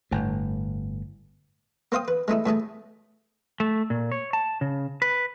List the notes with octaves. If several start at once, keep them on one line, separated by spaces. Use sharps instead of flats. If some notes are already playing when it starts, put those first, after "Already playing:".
G1 A2
A#3 C5 F5 G5 D#6
B4
G#3 A3 D#4 E4
A2 A3 G#4 A5
A3
A#2
C#5
A5
C#3
B4